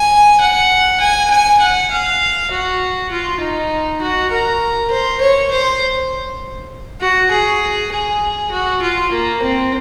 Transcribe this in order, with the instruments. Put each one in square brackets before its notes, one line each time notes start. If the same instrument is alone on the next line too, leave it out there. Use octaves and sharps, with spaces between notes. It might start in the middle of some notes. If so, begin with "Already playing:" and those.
Already playing: [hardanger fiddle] G#5
F#5
G#5
G#5
F#5
F5
F#4
F4
D#4
F#4
A#4
C5
C#5
C5
F#4
G#4
G#4
F#4
F4
A#3
C4